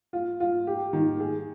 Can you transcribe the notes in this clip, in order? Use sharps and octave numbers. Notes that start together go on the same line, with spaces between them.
F4
F4
G4
D#3
G#4